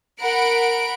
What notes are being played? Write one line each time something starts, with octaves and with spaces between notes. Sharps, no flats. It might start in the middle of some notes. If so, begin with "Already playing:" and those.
A#4 F#5 B5 D7